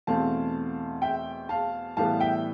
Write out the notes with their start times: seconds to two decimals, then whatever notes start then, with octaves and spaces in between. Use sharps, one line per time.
0.07 E2 B2 A3 C4 F5 A5
1.02 E5 G5
1.49 F5 A5
1.97 A2 E3 G3 B3 F5 A5
2.20 E5 G5